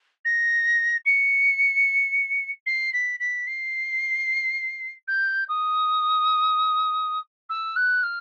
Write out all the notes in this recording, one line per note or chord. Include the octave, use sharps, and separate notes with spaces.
A#6
C#7
C7
B6
B6
C7
G6
D#6
E6
F#6
F6